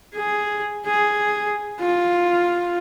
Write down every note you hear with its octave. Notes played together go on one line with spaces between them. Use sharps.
G#4
G#4
F4